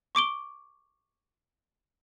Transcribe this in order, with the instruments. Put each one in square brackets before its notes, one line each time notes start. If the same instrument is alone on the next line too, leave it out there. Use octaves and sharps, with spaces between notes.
[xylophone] C#6 D6 D7 G7